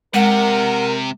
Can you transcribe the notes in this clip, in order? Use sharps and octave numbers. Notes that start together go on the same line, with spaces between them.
C3 G#3 A#4 F#5